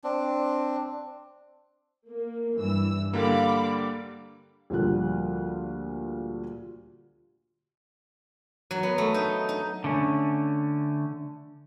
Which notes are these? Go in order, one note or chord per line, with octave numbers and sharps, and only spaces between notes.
C4 D4
A#3
G2 E3 E6
D3 G3 A#3 F5 B5 D6
D2 A#2 F3 G3 F4 F#6
F#3
B3
A3
D#4
D#4
D3 A3 C#4